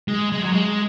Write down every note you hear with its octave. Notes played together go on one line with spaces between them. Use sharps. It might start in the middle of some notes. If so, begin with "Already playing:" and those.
G#3
G#3
F#3
G#3